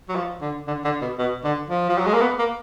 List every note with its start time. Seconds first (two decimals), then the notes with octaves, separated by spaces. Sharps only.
0.09 F#3
0.15 F3
0.41 D3
0.67 D3
0.85 D3
1.01 B2
1.18 B2
1.44 D3
1.70 F3
1.89 F3
1.98 F#3
2.06 G#3
2.14 A#3
2.21 B3
2.39 A#3